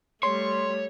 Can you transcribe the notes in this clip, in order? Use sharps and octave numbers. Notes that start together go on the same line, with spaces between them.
G3 A3 C#5 C6